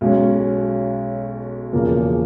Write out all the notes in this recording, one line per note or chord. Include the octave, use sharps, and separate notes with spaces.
B1 B2 G#3 C#4
E1 E2 C#3 F3 A#3